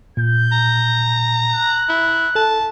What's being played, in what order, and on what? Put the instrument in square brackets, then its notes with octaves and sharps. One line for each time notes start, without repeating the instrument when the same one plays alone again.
[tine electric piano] A#2 [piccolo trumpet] G6
[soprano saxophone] A#5
[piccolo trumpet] F#6
[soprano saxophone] E4
[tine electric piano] A4 [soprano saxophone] A5